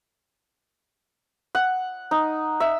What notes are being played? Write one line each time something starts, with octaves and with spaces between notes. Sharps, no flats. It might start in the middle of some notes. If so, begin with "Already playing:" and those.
F#5
D#4
E5